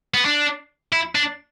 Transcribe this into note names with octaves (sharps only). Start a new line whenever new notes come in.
B3
D4
E4
D4